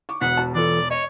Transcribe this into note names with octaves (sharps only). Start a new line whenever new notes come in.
C#6 D6
E1 B2 F#5 B6
F#4 A5
E3 F4 A4 D5
C#5 D#5